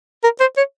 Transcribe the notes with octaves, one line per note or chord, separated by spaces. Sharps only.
A#4
C5
C#5